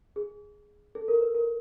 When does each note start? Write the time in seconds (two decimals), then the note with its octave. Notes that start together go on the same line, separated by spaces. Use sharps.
0.16 G#4
0.95 A4
1.08 A#4
1.21 B4
1.35 A#4